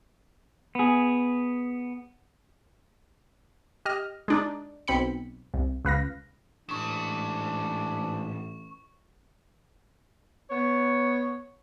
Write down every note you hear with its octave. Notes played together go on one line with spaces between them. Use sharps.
B3 G#4
G4 D#5 F6
G#3 D4 D#4
B1 C4 B5 C#7
C2
C#2 B4 F5 A#6
A1 G#2 D4 C#6 E7
B3 C#5